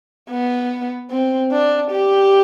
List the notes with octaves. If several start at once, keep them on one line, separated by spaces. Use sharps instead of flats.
B3
C4
D4
G4